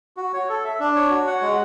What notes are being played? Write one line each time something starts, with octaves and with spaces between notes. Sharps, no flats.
F#4
C#5
A4
E5
D4
C#5
F#4
F#5
G#3